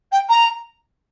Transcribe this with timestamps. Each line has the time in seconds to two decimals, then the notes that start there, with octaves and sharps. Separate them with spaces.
0.12 G5
0.29 A#5